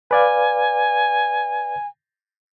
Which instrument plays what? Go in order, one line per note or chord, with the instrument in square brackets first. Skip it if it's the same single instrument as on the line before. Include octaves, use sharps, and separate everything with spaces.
[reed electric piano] B4 D5 F5 [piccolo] G#5